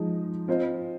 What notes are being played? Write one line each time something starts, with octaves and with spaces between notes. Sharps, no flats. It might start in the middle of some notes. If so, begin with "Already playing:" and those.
Already playing: F3 G#3 D#4
C4 F4 C5 D#5